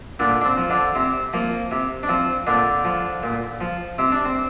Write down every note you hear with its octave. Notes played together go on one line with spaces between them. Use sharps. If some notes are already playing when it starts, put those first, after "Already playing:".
A#2 D3 D4
D4
C4
F3
D3 D4
C3 C4
F3 A#3
C3
D4
F3 C4
A#2 D3 D4
F3
A#2
F3
C3 C4
D4
C4